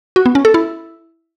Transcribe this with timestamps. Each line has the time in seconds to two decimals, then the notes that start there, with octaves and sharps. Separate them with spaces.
0.16 F#4
0.26 B3
0.35 C#4
0.45 A4
0.54 E4